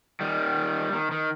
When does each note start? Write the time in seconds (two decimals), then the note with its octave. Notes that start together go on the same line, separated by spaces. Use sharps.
0.21 D#3 G3
0.93 D#3
1.12 D#3